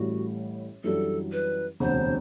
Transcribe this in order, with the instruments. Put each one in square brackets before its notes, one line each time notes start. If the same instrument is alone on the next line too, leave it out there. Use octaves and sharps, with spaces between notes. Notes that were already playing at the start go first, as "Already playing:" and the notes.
Already playing: [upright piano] A1 A2 G3 [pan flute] F#4
[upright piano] F#2 E3 G3 D4 F#4 [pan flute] A4
[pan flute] B4
[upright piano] E1 D2 C3 [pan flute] C5